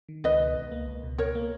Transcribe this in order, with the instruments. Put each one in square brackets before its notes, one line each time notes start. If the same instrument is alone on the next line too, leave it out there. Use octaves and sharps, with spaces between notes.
[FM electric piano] D#3
[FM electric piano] C#2 [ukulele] B4 D#5
[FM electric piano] B2
C#2
A#3
C#2
B2
[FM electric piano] B2 [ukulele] A#4 C#5
[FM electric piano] A#3